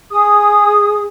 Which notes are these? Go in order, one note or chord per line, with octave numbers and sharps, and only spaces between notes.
G#4 D#6